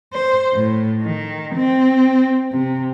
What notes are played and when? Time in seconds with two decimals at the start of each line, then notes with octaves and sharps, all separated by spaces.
0.13 C5
0.53 A2
1.02 D#3
1.55 C4
2.51 C3